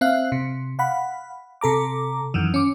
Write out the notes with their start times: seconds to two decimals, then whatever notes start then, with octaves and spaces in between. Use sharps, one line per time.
0.01 C4 E5 F5 F#6
0.32 C3
0.79 F5 F#5 B5
1.61 C3 A4 A#5 D6
2.34 F#2 D#3 E3
2.54 C#4 D6